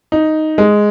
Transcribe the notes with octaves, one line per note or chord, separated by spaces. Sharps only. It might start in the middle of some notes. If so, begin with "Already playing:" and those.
D#4
G#3